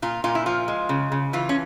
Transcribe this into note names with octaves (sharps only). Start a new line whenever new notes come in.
A#2 F4
A#2 F4
E4
F3 F4
G#3
C#3
C#3
E3 F4
C#4